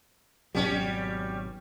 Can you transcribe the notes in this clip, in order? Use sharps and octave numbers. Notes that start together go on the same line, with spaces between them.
G#1 B2 F#3 G3 C#4